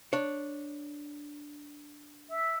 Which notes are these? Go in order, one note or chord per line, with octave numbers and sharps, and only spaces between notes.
D4 C#5
E5 E6